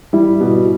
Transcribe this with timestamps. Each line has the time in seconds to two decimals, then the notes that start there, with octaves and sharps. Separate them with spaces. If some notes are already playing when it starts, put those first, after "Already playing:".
0.13 G3 E4
0.41 B2